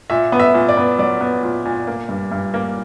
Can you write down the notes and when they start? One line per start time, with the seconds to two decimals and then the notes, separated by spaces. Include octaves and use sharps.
0.10 A#2 E5
0.32 B3
0.40 E5
0.54 A#2
0.69 D5
0.77 B3
0.98 F#3 D5
1.21 B3
1.43 A#2
1.65 A#2
1.87 A#3
2.09 G2
2.32 G2
2.54 A#3